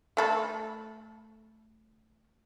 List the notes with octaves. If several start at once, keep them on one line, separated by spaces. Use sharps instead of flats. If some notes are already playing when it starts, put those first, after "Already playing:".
A3 A4 B5